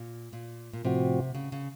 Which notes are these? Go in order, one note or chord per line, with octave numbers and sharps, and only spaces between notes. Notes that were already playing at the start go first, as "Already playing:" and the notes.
Already playing: A#2
A#2
A#2
A2 C3 F3 C4 F#4
C#3
C#3